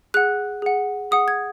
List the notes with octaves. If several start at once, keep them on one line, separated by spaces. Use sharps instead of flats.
G#4 F#5 F#6
G#4 F#5
G#4 F#5 D#6
G#6